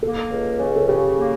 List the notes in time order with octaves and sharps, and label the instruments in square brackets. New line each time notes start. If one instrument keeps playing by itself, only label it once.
[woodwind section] A#3 [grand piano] A4
[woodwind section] C#2
C#3
[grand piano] A4
[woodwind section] C#3 [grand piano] G4
[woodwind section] A#3